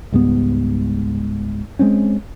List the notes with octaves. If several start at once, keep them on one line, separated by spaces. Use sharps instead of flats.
C#2 G#2 G3 B3
G#3 A3 C4 C#4